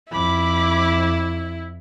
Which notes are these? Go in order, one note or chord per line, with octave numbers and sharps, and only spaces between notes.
F2 E4 B5 D6